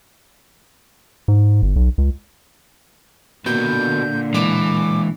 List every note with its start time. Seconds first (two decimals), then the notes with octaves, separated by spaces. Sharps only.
1.28 G#2
1.62 G1
1.76 B1
1.98 C#2
3.46 A#2 D3 B3 F#4 A#4 G6
4.34 E3 G#3 D4 D6